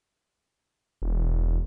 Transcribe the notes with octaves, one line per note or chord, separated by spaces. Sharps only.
E1